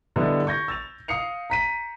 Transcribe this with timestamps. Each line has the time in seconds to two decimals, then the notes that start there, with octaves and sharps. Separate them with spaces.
0.16 D3 G3 B3 E4 D#5 A6
0.47 C#6 G6 G#6 A#6
0.68 E6 A6 F7
1.08 F5 D#6 C7 C#7 F7
1.50 A#5 B6 D#7